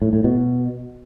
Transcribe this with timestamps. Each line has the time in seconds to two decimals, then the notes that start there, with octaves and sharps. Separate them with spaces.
0.02 A2
0.13 A2
0.24 B2